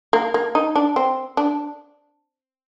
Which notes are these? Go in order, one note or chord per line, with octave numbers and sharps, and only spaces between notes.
A#3
A#3
D#4
D4
C4
D4